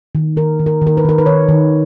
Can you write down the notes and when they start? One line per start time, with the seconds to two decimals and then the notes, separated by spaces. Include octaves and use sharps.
0.15 D#3
0.37 D#3 A#4
0.59 D#3
0.66 A#4
0.81 D#3
0.87 A#4
0.97 B4
1.05 D#3 A#4
1.18 B4
1.26 D#3 C#5
1.49 D#3